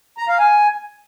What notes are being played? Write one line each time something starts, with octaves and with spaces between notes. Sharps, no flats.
A#5
F5
G#5